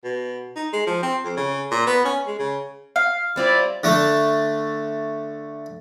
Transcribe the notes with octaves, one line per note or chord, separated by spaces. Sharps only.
B2
D#4
G#3
F3
C4
F2
C#3
A#2
B3
C#4
G#3
C#3
F5
G3 C4 E4 F4 D5
D3 A3